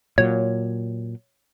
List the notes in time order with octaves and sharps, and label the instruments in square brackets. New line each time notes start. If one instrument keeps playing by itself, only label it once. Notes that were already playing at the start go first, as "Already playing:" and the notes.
[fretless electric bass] A#2 F#3 [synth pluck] C#5